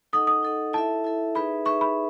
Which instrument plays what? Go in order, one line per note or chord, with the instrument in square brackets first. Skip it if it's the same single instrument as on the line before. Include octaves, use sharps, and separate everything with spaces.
[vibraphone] D#4 A4 D#5 F#5 [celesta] D#6
[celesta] D#6
[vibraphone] D#4 A4 D#5 F#5
[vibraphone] E4 A4 E5 [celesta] A5
[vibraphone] E4 A4 E5
[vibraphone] D#4 G#4 B4 E5 [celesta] B5
[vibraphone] D#4 G#4 B4 E5 [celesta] C#6
[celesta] B5